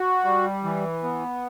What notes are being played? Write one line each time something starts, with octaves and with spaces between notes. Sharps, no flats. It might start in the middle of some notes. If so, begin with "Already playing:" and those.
Already playing: F#4
G3
E3
B3